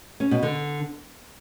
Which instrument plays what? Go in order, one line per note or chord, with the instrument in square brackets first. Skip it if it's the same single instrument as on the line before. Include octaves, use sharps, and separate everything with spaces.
[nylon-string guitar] C#4
B2
D3